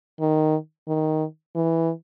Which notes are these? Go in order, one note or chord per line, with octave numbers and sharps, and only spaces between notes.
D#3
D#3
E3